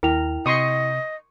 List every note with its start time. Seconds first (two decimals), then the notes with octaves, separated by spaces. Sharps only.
0.03 D#2 E4 A#4 G5 F7
0.46 C3 D#5 C6 C#6 D#6